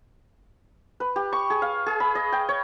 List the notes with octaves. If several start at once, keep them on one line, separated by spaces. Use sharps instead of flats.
B4
G4
C#6
G#4
F5
G#4
B5
D#5
G5
C#5